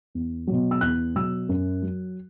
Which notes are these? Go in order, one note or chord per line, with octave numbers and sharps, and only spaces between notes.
E2
B2 F#3
E6
E2 F#6
B2 F#3 E6
F#2
F#3